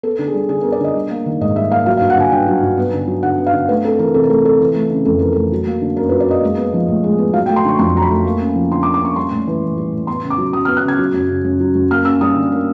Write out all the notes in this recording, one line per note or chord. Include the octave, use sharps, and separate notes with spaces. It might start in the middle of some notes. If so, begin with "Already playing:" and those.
B3 A4
D3
G#4
G3
D3 G#4
A#4
B3
D5
D3 D#5
G3
A#3
D#3
G#2 D#5
G3 E5
A#3 F5
F#3 F5
F5
G2
F#5
D3 G#5
G2 G5
F#3
G2
B3
D3
F#3
D3 F#5
B3
F5
D3
A3 B4
C4 A4
E3 A#4
C3 A4
A#4
A3 A4
C4 A4
E3
A3
C#3
F2 A4
E3 A#4
A3 A4
F#3
A#3
D3
F#2 A#4
B4
F#3
D5
A#3 D#5
G#3
B3
F3
A2
G#3
B3
F#3 F5
G5
A3
C6
D3 C#6
F2 C6
F#3 A#5
B5
A3
A#3
C#4
F3
D3 C6
D6
A#3
D6
C#4 C#6
G3 C6
A2
E3
A2
G3
A2
B3 C6
C#3
D6
F#3
C#3 D#6
F6
B3
F#6
C#3 G#6
F#3
F#2
C#3
F#2
F#3
F#2
A#3 F6
C#4 E6
G3 D#6
D3
A#3